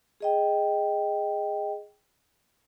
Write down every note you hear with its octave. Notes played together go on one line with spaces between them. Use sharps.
G#4 D#5 G5